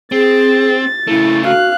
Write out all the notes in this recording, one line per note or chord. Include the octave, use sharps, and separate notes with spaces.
C4 G#4 A6
C#3 A3 E4
F#4 F5 F#6